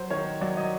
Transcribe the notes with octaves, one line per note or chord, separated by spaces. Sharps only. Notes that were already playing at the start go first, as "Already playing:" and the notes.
Already playing: F#3 C5
D#3 C#5
F#3 D5
D#5